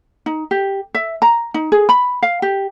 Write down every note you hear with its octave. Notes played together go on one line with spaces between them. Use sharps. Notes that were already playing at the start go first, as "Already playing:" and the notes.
D#4
G4
E5
A#5
D#4
G#4
B5
F5
G4